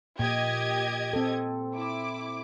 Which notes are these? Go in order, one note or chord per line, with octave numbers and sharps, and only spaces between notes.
A#2 G4 D#5 G#6
C4 A4
E4 D6